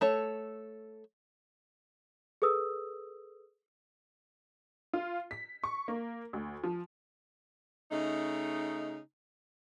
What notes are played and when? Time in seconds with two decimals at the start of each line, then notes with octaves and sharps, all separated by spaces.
0.01 A3 A4 C#5
2.42 G#4 A4 B4 D#6 E6
4.93 F4
5.31 B6
5.64 C#6
5.88 A#3
6.33 D2
6.64 F3
7.91 C#3 A3 D#4